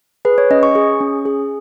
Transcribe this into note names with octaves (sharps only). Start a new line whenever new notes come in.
G#4 B4
C#5
C#4 D#5
C#6
G#4
C#4
G#4